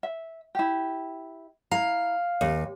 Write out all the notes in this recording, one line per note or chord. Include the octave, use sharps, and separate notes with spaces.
E5
E4 G4
E4 F5 A#5
D#2 F5